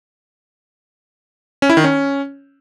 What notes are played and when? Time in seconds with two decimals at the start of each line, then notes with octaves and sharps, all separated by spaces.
1.62 C#4
1.70 E4
1.77 D#3
1.84 C#4